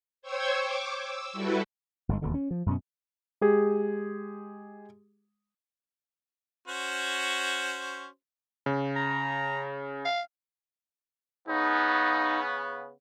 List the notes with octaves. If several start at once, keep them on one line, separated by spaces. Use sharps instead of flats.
C5 C#5 G5 C#6 E6 G#6
D6
E6
G3 E4 F#4 A4 B4
G1 G#2 D3 G#3
E1 D#2 B2 D3
C#4
F3
F#2 B2 C#4
G#3 G4 G#4
C#4 F#4 C5
C#3
A#5
F5
C#3 B3 D#4